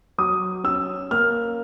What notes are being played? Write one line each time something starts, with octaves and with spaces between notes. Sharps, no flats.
F#3 D#6
C#4 E6
A#3 F6